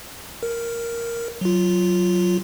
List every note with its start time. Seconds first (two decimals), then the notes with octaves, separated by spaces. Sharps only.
0.43 A#4
1.41 F#3 F4